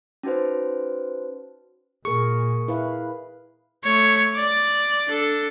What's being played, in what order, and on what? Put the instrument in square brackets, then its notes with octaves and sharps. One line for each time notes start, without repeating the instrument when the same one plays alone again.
[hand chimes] C#4 D#4 F#4 B4 C5
[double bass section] A#2 [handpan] G#4 A#4 [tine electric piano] C#6
[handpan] E4 B4 F5
[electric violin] A3 C#5
D5
D4 A4